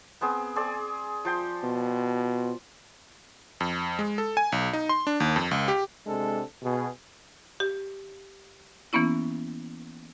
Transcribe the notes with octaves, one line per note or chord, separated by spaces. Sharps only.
B3 C4 G#4
C4 G#4 D5
F3 G5 C6
B2
F2
G#3
A4
G#5
B1
D#4
C6
D4
D#2
F2
C#2
G4
C3 G#3 D4 A4
B2 G#4
G4
E3 A#3 B3 C#4 E4